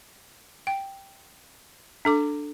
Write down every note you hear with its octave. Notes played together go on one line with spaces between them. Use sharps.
G5
D4 A4 D6